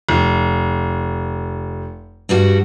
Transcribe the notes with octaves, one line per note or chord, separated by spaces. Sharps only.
F1
G2 G3 F#4